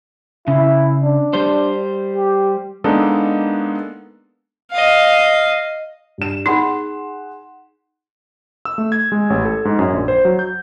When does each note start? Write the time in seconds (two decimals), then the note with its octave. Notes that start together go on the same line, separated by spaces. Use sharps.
0.48 C#3 E4
1.01 D4
1.34 G3 C5
2.17 G4
2.84 G#3 A#3 B3 D4 D#4 A4
4.72 D#5 F5
6.18 G2 E7
6.46 D#4 G#4 F#5 C6
8.65 E6
8.78 A3
8.92 G#6
9.12 G#3
9.30 A1
9.45 A4
9.65 G#2
9.79 F#2
9.93 A#1
10.08 C5
10.25 F#3
10.39 G6